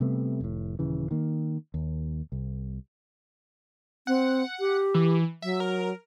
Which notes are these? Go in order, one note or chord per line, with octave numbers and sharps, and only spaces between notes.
C3 G3 A3 B3
F1 A2
D#1 C#3 E3
D#3 A#3
D#2
C2
C4 F#5
G4
E3
F#3 E5
A#4